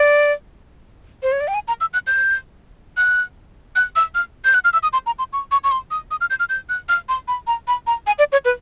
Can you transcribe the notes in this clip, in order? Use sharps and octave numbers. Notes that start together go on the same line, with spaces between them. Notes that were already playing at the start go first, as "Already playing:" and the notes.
Already playing: D5
C5
C#5
D5
G5
G#5
A#5
E6
F#6
G6
F#6
F#6
E6
F6
G6
F#6
F6
E6
D#6
C6
A#5
C6
C#6
C#6
C#6
C6
D#6
D#6
F6
G6
F6
G6
F#6
F6
C6
B5
A#5
B5
A#5
G#5
D5
C#5
B4